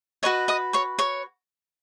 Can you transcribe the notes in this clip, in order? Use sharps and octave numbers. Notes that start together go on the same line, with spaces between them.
F#4 B4 C#5 D#5 C#6
D#5 D#6
C#5 C#6
C#5 C#6